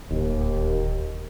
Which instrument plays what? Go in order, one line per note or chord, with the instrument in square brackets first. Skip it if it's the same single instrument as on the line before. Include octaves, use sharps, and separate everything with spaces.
[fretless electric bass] D1 [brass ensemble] D#2